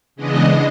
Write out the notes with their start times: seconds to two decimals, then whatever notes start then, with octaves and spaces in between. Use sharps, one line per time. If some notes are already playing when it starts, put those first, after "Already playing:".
0.16 C#3 E3 G#3 B3 D4 D#5